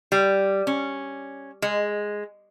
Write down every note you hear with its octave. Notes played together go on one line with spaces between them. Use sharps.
G3
C#4
G#3